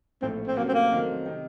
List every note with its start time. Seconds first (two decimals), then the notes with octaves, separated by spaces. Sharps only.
0.22 A#1 A2 A3 C4
0.47 C4
0.57 C3 F#3 A3 A#3 C#4 F#4
0.68 C4
0.74 A#3
0.91 F2 D#3 F#3 A3 C4
1.26 C3 D#3